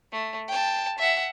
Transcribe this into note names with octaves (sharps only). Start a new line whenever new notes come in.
A3
G5 A5
E5 F#5